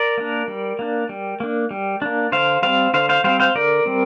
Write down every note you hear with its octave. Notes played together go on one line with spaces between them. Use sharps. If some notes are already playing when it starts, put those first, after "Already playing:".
Already playing: A#4 D5
A#3 D4
G3
A#3 D4
G3
A#3 D4
G3
A#3 D4
D3 C5 F5
G3 C4 C5 F5
D3 C5 F5
C5 F5
G3 C4 C5 F5
C5 F5
D3 A#4 D5
G3 C4